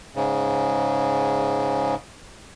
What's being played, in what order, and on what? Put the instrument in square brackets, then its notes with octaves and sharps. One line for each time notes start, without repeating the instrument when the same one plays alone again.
[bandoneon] G#2 C#3